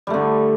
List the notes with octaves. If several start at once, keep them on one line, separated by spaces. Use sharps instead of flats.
D3 G3 A3